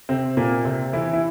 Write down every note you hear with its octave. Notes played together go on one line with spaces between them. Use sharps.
C3 C4
A#2 A#3
C3 C4
E3 E4
E4